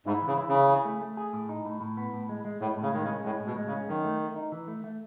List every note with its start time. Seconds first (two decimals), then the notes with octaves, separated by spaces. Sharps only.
0.06 G#2 E4
0.22 E3
0.27 C#3
0.38 E4
0.49 C#3
0.54 E4
0.70 G#4
0.85 A3
1.01 A3
1.17 G#4
1.33 A2
1.49 D#4
1.66 A2
1.81 A2
1.97 B3
2.13 A2
2.29 G#3
2.45 G#3
2.61 A2 G#3
2.77 A2
2.82 C#3
2.93 D#3 G#3
3.03 C#3
3.08 C#4
3.24 A2 G#3
3.40 A2
3.46 B2
3.57 G#3
3.67 C#3
3.72 C#4
3.88 F#2 D#3
4.04 A3
4.20 A3
4.36 D#4
4.52 E3
4.68 A3
4.84 A3